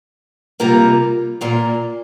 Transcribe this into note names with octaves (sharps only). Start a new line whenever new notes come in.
C3 G3 A#3 F4 A#4
A#2 A#3 F4 A#4